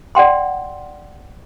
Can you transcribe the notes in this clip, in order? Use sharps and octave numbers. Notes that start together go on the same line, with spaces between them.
D5 F#5 G5 C6